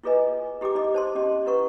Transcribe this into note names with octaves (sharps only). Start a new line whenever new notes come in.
E4 F4 G#4 B4 D#5 G#5
E4 G4 G#4 G5 D6
D#4 E4 D#5 D6
C5 A5 C6
C#4 G4 D#5
E4 B4 F#5 C#6